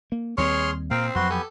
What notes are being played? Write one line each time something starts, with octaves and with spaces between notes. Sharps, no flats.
A#3
D#2 G3 C4 G#4 C#5 C6 F6
A#2 C4 A#4 F5 G5
F2 F#3 F#4 B4 C6
B3 G4 A4 G#5